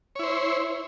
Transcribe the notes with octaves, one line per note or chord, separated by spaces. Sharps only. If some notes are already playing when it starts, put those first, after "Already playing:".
E4 C5 C#5